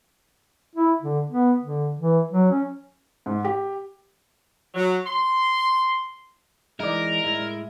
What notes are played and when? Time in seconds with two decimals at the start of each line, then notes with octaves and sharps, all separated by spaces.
0.76 E4
1.02 D3
1.30 B3
1.61 D3
1.99 E3
2.32 F#3
2.51 C#4
3.26 G#2
3.45 G4
4.74 F#3
5.05 C6
6.80 E3 G#3 D#4 A#4 D5
7.24 A2 G#3 E4